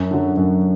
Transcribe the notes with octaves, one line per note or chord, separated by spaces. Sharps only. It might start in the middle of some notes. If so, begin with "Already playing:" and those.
Already playing: F#2
D3 F#3
F#2